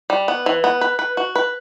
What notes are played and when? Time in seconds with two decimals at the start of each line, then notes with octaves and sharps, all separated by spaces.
0.10 G3
0.28 B3
0.46 E3
0.64 B3
0.81 B4
0.99 B4
1.17 F#4
1.35 B4